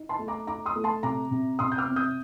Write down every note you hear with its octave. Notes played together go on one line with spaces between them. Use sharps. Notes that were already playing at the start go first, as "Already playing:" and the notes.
Already playing: D#4
A5 C6
A3
A#5 D6
D#4 A#5 D6
C6 D#6
A3
A5 C6
C3 A#5 D6
C3
C3 C6 D#6
G6
D6 F6
C4
D#6 G6